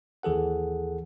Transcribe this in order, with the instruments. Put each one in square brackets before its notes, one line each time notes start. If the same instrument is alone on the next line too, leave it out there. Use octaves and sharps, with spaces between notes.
[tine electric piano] D#2 E3 G#4 A4 F#5